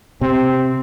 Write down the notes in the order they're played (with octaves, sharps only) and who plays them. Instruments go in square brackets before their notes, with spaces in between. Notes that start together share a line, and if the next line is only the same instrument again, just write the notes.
[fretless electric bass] C3 [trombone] C4